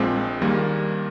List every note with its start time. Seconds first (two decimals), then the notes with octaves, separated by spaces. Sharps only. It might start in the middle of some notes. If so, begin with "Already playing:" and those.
Already playing: A#1 A#2 G#3 C4
0.16 G#3
0.41 D#2 D#3 G3 A#3